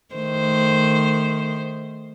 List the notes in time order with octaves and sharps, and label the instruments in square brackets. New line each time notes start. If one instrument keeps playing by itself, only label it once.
[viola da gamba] D#3 A3 C5